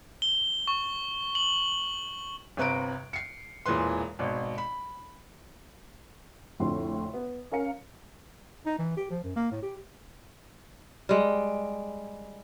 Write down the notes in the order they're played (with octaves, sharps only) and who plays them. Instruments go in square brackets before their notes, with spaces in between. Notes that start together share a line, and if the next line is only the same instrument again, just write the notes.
[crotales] G7
C#6
F#7
[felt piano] G1 C3 B4 A#5 D7
C7 C#7
E1 A#2 E3 G#4 B4 C6
G#1 B2
B5
[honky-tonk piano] A#1 F2 A2 D3 C6
B3
C#4 A#4 F5 C#7
[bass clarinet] D#4
E3
G4
F3
F#2
A#3
A2
G4
[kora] G3 G#3